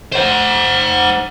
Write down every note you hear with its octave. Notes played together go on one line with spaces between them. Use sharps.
C5 F#5